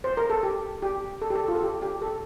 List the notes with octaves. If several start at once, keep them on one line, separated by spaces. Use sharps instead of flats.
C5
A#4
A4
G4
G4
A4
G4
A4
F4
A4
G4
G4
A4